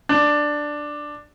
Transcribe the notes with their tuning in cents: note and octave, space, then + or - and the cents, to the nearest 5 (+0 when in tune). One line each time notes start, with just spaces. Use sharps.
D4 +5